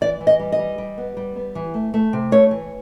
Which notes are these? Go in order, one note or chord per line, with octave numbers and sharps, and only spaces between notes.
E3 D5
E3
D#5
G3
D#5
G3
G3
B3
G3
B3
E3
A3
A3
C3
A3 C#5
E3